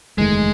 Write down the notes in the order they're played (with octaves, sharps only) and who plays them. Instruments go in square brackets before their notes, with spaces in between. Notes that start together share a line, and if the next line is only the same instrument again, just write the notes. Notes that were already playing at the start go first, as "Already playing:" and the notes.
[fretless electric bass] F#1 E2 D#3 A3 [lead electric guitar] G#3